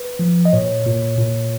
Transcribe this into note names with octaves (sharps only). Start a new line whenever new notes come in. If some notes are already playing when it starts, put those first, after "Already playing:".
Already playing: B4
F3
D#5
A#2 C#5
A#2
A#2